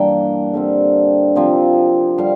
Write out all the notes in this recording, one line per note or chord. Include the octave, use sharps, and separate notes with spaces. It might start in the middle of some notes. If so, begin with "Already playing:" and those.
Already playing: G2 E3 A#3 D4 G5
D3 G3 C4
C3 F3 C4
D3 G3 F5